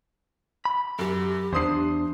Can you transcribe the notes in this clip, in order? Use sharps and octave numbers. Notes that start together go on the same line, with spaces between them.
B5
F#2 G4
E2 D4 C5 D#6 C7